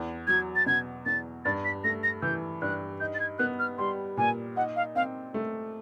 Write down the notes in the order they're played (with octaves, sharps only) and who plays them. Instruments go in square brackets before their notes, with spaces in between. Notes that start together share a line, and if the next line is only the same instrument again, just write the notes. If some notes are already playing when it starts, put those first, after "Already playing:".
Already playing: [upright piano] E2
[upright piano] F#3 [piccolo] G#6
[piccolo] A6
[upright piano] B2 [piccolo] G#6
[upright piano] E2 [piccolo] A6
[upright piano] G2 [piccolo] A6
[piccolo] B6
[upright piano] A3 [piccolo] A#6
[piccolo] A#6
[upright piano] E3 [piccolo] G6
[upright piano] G2 [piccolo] F#6
[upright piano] D#4 [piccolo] G6
[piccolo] A6
G#6
[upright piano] B3 [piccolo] F#6
[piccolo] F6
[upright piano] G3 [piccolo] C6
[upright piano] A#2 [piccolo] G#5
[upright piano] D#4 [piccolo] F#5
[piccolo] F5
[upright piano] C4 [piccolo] F5
[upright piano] A3